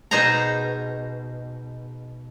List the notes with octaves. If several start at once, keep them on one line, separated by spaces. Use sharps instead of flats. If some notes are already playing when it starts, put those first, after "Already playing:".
B2 D#4 G#4 C5 G#5 A#5